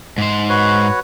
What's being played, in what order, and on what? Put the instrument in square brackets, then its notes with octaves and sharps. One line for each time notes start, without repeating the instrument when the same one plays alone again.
[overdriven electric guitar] G#2 C5
[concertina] F#4 B4 C#5